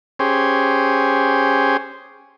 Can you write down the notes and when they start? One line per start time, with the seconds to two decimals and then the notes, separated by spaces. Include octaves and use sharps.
0.19 C#4 G4 G#4 C5